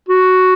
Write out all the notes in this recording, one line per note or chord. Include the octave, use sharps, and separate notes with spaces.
F#4